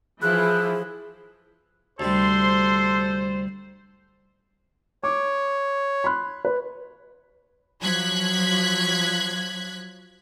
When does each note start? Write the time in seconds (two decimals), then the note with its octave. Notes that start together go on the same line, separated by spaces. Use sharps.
0.22 E3 F3 E4 G#4 F#6
2.00 D2 C3 G3 A4 C5 C6
5.04 C#5 D6
6.04 B5 C6 F#6
6.45 B4
7.82 F3 F#3 F#6 G#6 B6